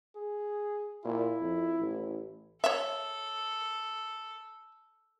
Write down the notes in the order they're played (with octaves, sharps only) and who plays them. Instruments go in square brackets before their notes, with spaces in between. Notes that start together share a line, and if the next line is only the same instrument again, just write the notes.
[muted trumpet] G#4
[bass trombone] A#2 [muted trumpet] E4
[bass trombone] F2
A1
[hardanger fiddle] A4 [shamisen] C#5 E5